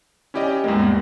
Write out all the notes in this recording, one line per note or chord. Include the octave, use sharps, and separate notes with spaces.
C#4 E4 G4 D5 D#5 G#5
E2 G#2 G3 G#3 A#3